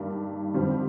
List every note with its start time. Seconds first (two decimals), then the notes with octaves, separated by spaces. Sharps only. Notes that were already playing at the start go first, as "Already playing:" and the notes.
Already playing: G2 D#3 G3 A#3
0.54 F2 D3 G3 C4